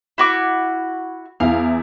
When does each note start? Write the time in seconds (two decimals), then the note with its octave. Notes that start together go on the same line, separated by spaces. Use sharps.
0.18 E4 F#4 D6
1.40 E2 E4 F5